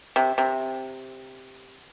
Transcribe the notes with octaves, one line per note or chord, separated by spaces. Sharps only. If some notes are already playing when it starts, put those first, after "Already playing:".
C3
C3